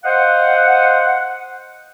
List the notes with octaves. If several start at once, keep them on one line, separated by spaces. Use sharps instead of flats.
C5 D#5 F5 F#5